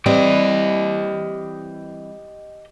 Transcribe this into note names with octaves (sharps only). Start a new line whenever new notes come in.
E3 G3 C4 G4 D#5